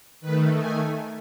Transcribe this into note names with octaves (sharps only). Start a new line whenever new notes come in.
D#3 A3 B4
G#5